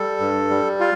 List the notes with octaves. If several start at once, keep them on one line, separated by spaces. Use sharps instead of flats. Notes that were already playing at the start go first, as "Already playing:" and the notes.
Already playing: G3 A4
G2
G3
F4